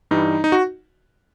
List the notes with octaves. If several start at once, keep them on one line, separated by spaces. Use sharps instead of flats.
G2 E3 G3 D#4
D#4
F#4